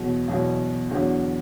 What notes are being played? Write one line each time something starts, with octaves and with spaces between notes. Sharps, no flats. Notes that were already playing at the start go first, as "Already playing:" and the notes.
Already playing: E2 B2 F#3
E2 B2 F#3
E2 D3 F#3